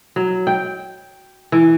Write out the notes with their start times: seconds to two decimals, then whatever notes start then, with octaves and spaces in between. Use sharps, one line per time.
0.16 F#3
0.47 G5
1.52 E3